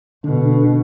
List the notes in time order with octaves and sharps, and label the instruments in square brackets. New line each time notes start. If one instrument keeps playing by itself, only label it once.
[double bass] B2 [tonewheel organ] D3